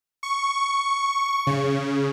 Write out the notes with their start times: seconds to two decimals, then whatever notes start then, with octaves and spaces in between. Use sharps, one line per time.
0.23 C#6
1.47 C#3